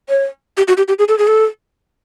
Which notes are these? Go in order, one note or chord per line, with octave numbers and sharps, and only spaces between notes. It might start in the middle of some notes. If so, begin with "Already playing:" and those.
C#5
G4
F#4
G4
G4
G#4
A4
G#4
A4